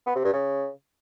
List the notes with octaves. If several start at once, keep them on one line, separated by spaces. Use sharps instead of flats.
B3
C3
G2
C#3